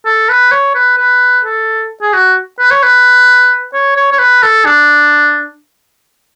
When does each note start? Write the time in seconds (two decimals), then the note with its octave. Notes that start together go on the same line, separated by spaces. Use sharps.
0.05 A4
0.29 B4
0.52 C#5
0.75 B4
0.98 B4
1.44 A4
2.02 G#4
2.13 F#4
2.59 B4
2.71 C#5
2.83 B4
3.74 C#5
3.97 C#5
4.12 C#5
4.19 B4
4.43 A4
4.66 D4